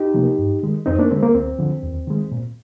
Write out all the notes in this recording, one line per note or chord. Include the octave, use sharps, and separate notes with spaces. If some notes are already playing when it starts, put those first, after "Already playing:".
Already playing: D#4 G4
C3 F3 A#3
G2
D#3 G#3
F2 C4 D#4
A#3 D4
D3 G#3 C4
A#3
D2 C4
D3 F3
D#2
D#3 G#3
A#2